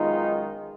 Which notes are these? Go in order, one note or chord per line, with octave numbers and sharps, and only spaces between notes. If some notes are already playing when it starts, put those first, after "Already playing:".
Already playing: F#2 D#3 G#3 B3 D#4 F4